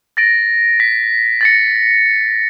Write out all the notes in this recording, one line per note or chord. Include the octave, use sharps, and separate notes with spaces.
A6 A#6 D7
B6
A6 A#6 C#7